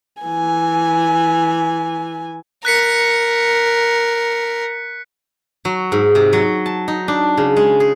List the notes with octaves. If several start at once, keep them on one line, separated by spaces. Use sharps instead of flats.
E3 G#5
A#4 F#6 B6 C#7
F#3
G#2
C3
F#3
A5
D#4
D4
C#3
G#3
G#4